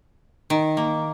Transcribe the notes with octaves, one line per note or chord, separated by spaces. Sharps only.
D#3
A#3